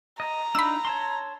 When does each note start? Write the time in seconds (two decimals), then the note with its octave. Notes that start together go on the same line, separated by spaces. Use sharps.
0.20 D#5 A#5
0.55 D4 D#4 F4 B5 E6
0.85 C#5 A5 C6